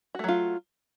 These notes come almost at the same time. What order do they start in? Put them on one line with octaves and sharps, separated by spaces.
F#4 A3 F#3 F4